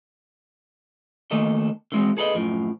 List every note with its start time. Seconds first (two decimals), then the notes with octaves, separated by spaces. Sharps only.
1.31 D#3 A3 A#3 A4 D#5
1.92 D3 E3 G#3 C4 F#4
2.17 G#4 A4 B4 D5 D#5
2.35 F#2 A2 F3